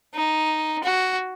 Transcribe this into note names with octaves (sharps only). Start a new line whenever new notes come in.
D#4
F#4